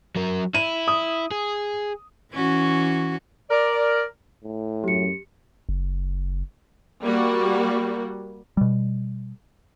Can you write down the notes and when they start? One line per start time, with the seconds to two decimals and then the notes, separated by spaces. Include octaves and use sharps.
0.16 F#3 A#4
0.54 E4 D#7
0.88 D#6
1.31 G#4
2.32 E3 C#4 F#4
3.50 A#4 D5
4.44 A2
4.84 F#2 G4 C#7
5.69 F#1
7.03 G3 A#3 F#4
8.57 B2 G3